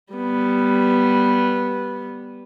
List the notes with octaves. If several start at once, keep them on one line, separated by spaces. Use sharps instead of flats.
G3 B3